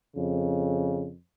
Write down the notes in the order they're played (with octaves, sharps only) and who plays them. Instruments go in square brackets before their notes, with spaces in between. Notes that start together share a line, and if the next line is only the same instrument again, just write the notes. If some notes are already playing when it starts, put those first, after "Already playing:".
[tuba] F2 [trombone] C#3